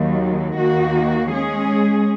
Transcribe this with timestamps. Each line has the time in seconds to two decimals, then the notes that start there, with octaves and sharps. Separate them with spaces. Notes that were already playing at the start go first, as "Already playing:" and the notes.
Already playing: D#2 D#3 F#3
0.57 D#2 D#3 A#3 F#4
1.31 G#3 C#4 G#4